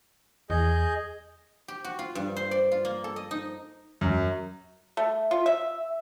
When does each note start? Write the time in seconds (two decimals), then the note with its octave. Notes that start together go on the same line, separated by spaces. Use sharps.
0.50 E2 G#4 D#5 G6
1.68 G4
1.84 F#4
1.99 F4
2.15 G2
2.37 C5
2.51 D5
2.71 F4
2.85 A#3
3.04 A4
3.16 D#5
3.31 D#4
4.01 F#2
4.97 A3
5.31 F4
5.46 E5